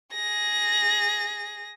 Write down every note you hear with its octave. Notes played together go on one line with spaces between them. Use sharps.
G#4 A#6